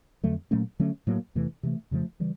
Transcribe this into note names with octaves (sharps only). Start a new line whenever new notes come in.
F2 D3 F#3 A3
A#2 F#3 A3 C#4
D3 F#3 A3 C#4
A2 F#3 A#3
E2 C3 E3 A3
C3 E3 A3
F2 C#3 F3 A3
C#3 E3 G3